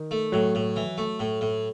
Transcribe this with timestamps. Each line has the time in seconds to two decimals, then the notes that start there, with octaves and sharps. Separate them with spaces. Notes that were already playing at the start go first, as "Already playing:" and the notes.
Already playing: D#3
0.11 A3
0.32 A2 F#3
0.55 A2
0.76 E3
0.98 A3
1.20 A2
1.41 A2